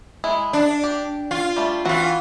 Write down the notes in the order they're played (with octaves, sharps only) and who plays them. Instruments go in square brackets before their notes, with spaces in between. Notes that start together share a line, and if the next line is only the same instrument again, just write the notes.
[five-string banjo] G#3 E4
[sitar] D4
[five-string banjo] G4
[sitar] F4
[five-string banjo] G3 A3
[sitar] E3 F4 [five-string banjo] C4 F#4